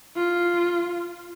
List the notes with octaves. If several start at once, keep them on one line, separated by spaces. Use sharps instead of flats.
F4